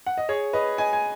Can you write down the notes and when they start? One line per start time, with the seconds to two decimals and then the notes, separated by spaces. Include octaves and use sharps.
0.06 F#5
0.18 D#5
0.29 G#4 C#5
0.53 B4 D#5
0.78 D#5 G#5
0.93 G#5